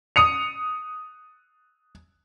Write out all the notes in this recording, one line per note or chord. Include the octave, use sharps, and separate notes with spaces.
D#6 C#7 F7